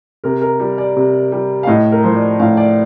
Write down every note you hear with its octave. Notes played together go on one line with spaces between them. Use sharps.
C3 A#4
A#4
G3
D5
C3
G3
F5
A2 D#5
A#4
F3 C5
D5
A2 F5
D5